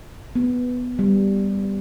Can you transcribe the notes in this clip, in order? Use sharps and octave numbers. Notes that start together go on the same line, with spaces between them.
B3
G3